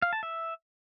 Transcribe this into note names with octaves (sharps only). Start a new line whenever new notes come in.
F5
A5
E5